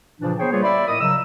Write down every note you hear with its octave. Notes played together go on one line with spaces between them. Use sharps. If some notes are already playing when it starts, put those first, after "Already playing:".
A#2 C#3 E3 F3 D4
B3 G#4 C5 C#5 G5
G3 A#3 F4 G#4 B4 C#5
D5 E5 B5
A2 A#4 D#5 D#6
C#3 F#3 E6